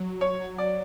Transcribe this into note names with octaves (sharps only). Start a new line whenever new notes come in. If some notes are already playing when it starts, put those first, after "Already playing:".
Already playing: F#3
C#5
D5